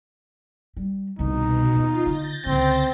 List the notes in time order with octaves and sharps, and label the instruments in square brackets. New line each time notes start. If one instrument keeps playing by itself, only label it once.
[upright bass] G3
[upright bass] C2 D#3 [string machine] B2 [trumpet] D#4
[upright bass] D#2 E3 [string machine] F4
[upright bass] D3 [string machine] G6 A6 A#6
[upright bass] C#2 D3 [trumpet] C4